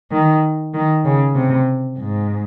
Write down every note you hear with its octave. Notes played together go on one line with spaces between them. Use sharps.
D#3
D#3
C#3
C3
G#2